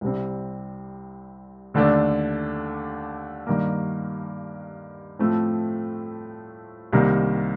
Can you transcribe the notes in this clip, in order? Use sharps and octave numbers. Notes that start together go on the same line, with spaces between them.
C2 C3 G3 C4
D#2 D3 A3 D4
G2 D#3 A#3
A2 F3 A3 C4
C2 C3 D#3 G3 A#3